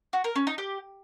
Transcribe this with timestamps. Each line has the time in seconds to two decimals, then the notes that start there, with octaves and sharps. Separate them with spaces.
0.13 F#4
0.24 A#4
0.36 C#4
0.47 D#4
0.58 G4